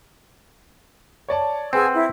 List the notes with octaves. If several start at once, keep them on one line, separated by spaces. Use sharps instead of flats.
C#5 D5 A5
C4 G#4 B4 F#5 G#5 E6
E4